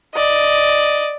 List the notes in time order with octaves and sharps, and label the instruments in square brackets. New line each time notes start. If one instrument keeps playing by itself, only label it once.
[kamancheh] D5 D#5